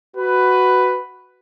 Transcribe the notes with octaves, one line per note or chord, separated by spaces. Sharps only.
F#4 B4